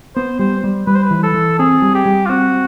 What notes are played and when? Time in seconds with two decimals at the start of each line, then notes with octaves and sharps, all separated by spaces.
0.16 B3 C5
0.39 G3 C5
0.64 G3
0.87 G3 B4
0.95 C5
1.03 B4
1.11 E3
1.23 A4
1.34 E3
1.59 C4 G#4
1.82 G3
1.95 G4
2.06 G3
2.26 F4
2.29 C4 F#4